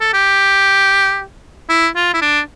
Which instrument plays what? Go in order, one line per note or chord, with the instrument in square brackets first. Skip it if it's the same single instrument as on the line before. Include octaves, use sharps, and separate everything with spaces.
[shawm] A4
G4
E4
F4
E4
D4